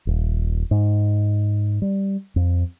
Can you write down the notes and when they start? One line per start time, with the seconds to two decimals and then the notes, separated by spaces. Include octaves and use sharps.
0.07 D#1
0.71 G#2
1.82 G3
2.36 F2